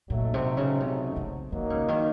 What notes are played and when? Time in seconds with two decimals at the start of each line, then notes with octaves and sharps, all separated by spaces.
0.10 A#2 F#3 A3 D#4
0.34 C3
0.57 C#3
0.80 C3
1.16 C#3
1.52 D#3 F#3 A#3 D#4
1.70 C#3
1.88 D#3